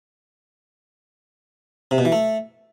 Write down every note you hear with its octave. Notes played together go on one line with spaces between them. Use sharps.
C3
B2
E3
A3